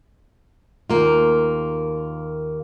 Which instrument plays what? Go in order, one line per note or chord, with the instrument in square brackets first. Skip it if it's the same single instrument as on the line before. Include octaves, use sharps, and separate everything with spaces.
[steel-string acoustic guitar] D#2 A#3 F4